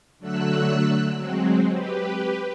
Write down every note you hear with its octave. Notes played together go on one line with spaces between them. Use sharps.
D3 F#3 A3 E6 F#6
F#3 G#3 C4
G4 B4